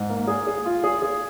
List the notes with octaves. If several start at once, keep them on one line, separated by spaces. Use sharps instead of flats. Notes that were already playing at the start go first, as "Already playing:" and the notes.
Already playing: G#2
A#3
G#4
G#4
F4
G#4
G#4